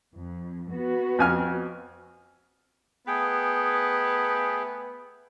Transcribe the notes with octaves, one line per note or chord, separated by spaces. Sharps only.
F2
B3 F#4
F2 G#5 F6
A3 B3 G#4 G5